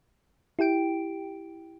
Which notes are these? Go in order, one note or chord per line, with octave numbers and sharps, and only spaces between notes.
E4 G4 G5 D7